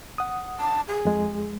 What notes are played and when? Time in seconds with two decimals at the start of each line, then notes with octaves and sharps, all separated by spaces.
0.18 F#5 D#6
0.59 A5
0.88 G#4
1.05 F2 G#3